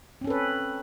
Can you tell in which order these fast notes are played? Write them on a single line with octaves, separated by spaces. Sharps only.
C4 C#4 A4 B4